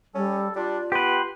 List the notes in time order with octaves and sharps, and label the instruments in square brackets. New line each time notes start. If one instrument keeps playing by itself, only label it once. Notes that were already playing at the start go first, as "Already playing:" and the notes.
[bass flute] G3 [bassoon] C#4 [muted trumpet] A4
[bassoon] G3 [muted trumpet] D4 [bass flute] F4
[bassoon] B3 [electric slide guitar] G4 B4 [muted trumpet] C6